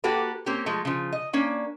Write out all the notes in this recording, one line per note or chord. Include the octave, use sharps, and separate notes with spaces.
A#3 F#4 G4 A4 B4
A#3 C4 C#4 G4
F3 G#3 A3
C#3 F3
D#5
A#3 C#4 D4